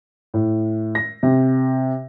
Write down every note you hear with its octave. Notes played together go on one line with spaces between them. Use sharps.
A2
A#6
C3